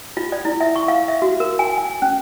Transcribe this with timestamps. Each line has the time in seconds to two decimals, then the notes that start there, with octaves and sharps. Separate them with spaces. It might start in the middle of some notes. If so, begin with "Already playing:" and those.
0.17 F4
0.32 D5
0.45 E4
0.60 E5
0.76 C#6
0.88 F5
1.08 E5
1.22 F#4
1.40 A#4
1.59 G#5
1.78 G#5
2.02 C#4